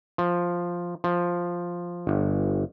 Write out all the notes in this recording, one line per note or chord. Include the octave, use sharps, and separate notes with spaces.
F3
F3
G1